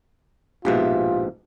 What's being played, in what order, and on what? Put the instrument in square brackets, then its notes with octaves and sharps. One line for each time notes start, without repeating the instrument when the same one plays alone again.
[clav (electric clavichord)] A#1 G#2 B2 [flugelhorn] F4 [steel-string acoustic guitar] G4 C5 E5